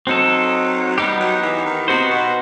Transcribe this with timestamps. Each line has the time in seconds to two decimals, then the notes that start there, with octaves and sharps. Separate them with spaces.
0.07 F#3 C4 D#4 A4
0.97 G3 B3 D#4 G4
1.20 F#3
1.42 E3
1.65 D#3
1.88 C3 B3 D#4 F#4 C5
2.10 B2